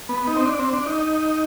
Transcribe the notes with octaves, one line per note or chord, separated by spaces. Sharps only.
B3
D#4
C4
D4
C4
D4
D#4